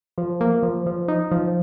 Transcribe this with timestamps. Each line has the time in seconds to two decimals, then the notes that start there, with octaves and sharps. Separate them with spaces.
0.18 F3
0.41 A#3
0.63 F3
0.86 F3
1.08 D#4
1.32 F3